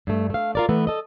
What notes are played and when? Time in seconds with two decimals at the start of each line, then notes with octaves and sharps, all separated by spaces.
0.07 G2 A3
0.30 A3 F5
0.55 F4 A#4 D5
0.69 E3 A3 B3
0.87 A4 D#5